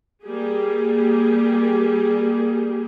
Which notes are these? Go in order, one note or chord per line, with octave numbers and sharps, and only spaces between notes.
G3 A#3 G4 G#4